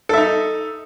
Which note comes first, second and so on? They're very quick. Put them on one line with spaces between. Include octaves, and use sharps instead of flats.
A4 E5 D#4